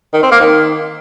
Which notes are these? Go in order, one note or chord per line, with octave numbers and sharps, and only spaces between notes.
D#3
C4
A#3
D#3